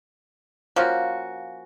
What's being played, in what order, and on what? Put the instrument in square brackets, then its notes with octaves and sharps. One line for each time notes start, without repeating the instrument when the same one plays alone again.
[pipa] F3 A#3 C#4 F#4